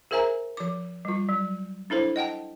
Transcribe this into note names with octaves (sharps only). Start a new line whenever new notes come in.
G#4 A#4 C5 E5 G#5 A#5
F3 D6
G3 F4
F#3
D4 E4 A4 C5
D#5 F#5 G5 A5